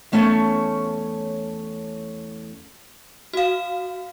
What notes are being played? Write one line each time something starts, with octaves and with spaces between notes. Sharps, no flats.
E2 A3 C#4 C#5 F#5 A5
F#4 F5